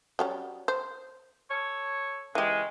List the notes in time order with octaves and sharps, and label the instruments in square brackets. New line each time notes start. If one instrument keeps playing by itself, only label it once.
[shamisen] F#3 G3 C#4
C5
[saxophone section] A4 C#5
[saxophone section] C#3 G#3 [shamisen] E3 G4